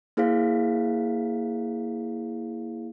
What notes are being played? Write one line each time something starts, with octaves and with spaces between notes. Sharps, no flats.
A#3 E4 G#4 C5 F5 B6